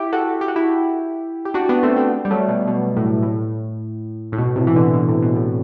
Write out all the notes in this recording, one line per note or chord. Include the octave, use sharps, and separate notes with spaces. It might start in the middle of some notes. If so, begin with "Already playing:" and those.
Already playing: E4 G4
F#4 A4
G4
F#4
E4 G4
G4
D4 F#4
B3 D4
A3 C4
A3 C4
G3
F#3 A3
B2
B2
A2
A2
A2
B2
A2 C3
E3
B2 D3
B2 D3
A2 C3
B2
A2